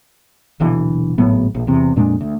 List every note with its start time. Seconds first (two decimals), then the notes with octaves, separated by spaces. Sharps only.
0.60 D#1 B1 D3 E3
1.18 G#1 A2 F#3 B3
1.55 A#1
1.67 E2 C3
1.96 F2 A#2 G#3 D4
2.21 D2